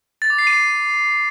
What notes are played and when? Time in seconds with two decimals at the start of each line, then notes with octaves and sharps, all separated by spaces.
0.22 A6
0.30 D6
0.39 C7
0.47 D#7